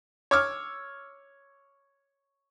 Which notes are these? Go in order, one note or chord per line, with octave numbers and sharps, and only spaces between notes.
C#5 D6 E6 F6